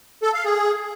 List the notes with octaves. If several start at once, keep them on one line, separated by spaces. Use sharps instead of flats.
A4
F5
G#4